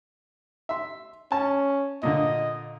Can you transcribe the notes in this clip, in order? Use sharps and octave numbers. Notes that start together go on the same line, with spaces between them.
E5 C6
C#4 A5
A#2 D3 D#5